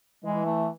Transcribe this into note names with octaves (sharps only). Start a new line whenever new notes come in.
E3 G#3
A3